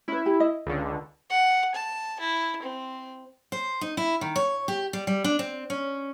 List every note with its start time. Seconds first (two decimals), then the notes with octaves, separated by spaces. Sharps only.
0.08 C#4 E4 B4
0.26 G4
0.40 D#5
0.66 C#2 D3
1.30 F#5
1.75 A5
2.21 E4
2.63 C4
3.52 C5
3.81 D#4
3.97 E4
4.21 D#3
4.36 C#5
4.68 G4
4.93 G3
5.07 G3
5.24 D4
5.39 C4
5.70 C#4